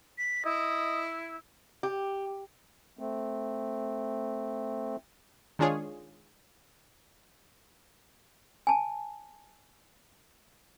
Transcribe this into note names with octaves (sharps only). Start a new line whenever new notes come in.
B6
E4 D#5
G4
A3 C4
D#3 G#3 D4 F4 G#4 C#5
G#5 A5